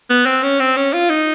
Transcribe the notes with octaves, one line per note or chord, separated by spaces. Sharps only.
B3
C4
C#4
C4
C#4
F4
D#4